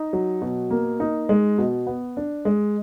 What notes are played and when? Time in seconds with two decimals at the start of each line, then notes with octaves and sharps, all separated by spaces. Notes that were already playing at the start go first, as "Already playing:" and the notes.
Already playing: D#4
0.13 F#3
0.42 B2
0.70 A#3
1.00 D#4
1.29 G#3
1.58 B2
1.87 B3
2.17 D4
2.45 G#3